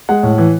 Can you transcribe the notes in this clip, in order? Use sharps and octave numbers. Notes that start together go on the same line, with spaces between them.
G#3 F#5
A2
E3